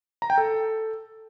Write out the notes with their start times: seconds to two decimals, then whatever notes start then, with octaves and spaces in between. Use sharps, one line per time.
0.22 A#5
0.30 G5
0.38 A4